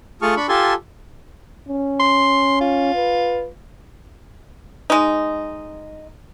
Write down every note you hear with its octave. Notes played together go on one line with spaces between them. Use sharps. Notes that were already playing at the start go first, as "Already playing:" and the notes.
A3 F4 G#4 A5 C#6 F6
D4 B5 C#6
F4 G4 A4 G#5 A5 C6
C#4
C6
F4
B4
G#3 D#4